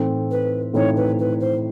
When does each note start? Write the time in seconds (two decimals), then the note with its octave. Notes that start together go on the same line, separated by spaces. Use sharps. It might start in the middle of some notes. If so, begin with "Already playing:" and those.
Already playing: A2 E3 A3 C4 D#4
0.31 B4
0.74 A2 E3 A3 C4 D#4 C#5
0.96 B4
1.18 B4
1.40 C5